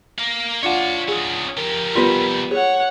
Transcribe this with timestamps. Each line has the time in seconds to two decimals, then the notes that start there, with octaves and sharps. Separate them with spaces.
0.18 A#4 F5
0.63 D4 F4 C#5 F#5 A5
1.08 C#4 D#4 G#4
1.57 F3 G4 A#4
1.95 G3 B3 F4 C6
2.51 G#4 C#5 F#5